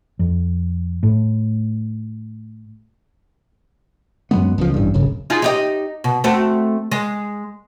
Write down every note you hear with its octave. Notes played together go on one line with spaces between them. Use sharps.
F2
A2
F#2 F#3 G#3 B3
C#2 F3
A1 G2
D#1 G#1 F#2 C#3
D#4 F4 G#4
D#4 G4 D#5
B2
A3 C4 F#4
G#3